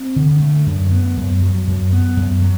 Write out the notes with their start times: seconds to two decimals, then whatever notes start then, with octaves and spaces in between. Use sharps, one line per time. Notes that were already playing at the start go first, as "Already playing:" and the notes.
Already playing: C4
0.16 D3
0.42 A3
0.66 F#2
0.92 B3
1.17 F#2
1.42 F#3
1.67 F#2
1.93 B3
2.17 F#2
2.42 F#3